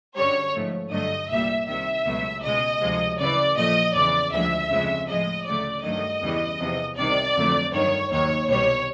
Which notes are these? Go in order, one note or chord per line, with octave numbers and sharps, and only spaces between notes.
F#2 D3 G3 C#5
G#2 F3 A3
G2 D3 F#3 A3 D#5
C2 A#2 G3 E5
C2 C3 D#3 E5
C#2 B2 F#3 A3
C#2 B2 G#3 D#5
D2 C3 F3 G#3
F#2 C#3 E3 D5
A#2 F3 A3 D#5
E2 C#3 E3 D5
D2 D3 F3 G#3 E5
F2 C#3 F3 G#3
A2 F3 G#3 D#5
D2 C#3 F#3 A3 D5
G2 D#3 F#3 A3 D#5
E2 C#3 E3 G3
E2 C3 F3
C2 C3 D#3 D5
F2 D3 F#3 A3
G2 D#3 F#3 C#5
D#2 D#3 F#3 C#5
C2 B2 G3 C#5